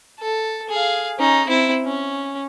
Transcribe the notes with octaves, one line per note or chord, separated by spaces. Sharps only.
A4
G#4 F5
C#4 D#4
C4 E4
C#4